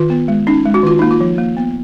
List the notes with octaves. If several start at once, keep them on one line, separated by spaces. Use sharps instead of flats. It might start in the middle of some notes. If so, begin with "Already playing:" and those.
Already playing: D#3 F4
B3
G#3
C#4 D#4
G#3
F#4
D#3 F4
A#3 D#4
F4
F3
A#3
B3